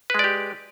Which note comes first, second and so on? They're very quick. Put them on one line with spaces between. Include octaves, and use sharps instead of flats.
B4 G#3 D5 G4